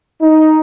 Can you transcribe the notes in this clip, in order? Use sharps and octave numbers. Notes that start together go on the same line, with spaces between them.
D#4